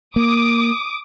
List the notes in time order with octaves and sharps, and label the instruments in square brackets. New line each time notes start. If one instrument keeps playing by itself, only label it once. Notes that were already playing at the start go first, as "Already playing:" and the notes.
[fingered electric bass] A#3 [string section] D6 D#6